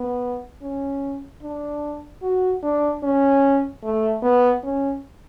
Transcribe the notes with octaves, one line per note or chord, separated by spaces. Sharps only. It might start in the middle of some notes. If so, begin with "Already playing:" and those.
Already playing: B3
C#4
D4
F#4
D4
C#4
A3
B3
C#4